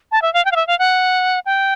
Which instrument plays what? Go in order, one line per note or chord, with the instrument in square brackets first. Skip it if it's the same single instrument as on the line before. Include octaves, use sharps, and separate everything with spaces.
[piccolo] A5
E5
F5
G5
F5
E5
F5
F#5
G5